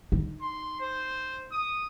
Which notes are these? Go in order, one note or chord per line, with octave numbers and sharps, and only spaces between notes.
D#4
C6
C5
D#6